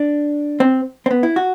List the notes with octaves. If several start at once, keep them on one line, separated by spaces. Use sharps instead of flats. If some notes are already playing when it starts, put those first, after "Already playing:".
Already playing: D4
C4
C4
B3
E4
F#4